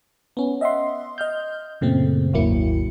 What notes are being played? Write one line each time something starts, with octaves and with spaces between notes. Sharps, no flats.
B3 C#4
D#5 E5 F#5 C6
D#5 F6 G6
F#2 A#2 C#3 A3 C4
G#1 D#2 F#3 A#3 E4 C#7